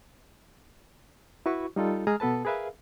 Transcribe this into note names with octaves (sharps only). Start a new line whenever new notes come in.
E4 F#4 B4 C#6
G3 D#4 F4 A4
G#3 G#4 A#5 D#6 F6
B2 B3 A4 B4 A5
G#4 A#4 B4 E5 F5